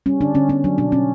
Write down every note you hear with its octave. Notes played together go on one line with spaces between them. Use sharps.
G3 C#4
D3 D4
D3 C#4
B3 C#4
F#3 D4
B2 D4
B2 C#4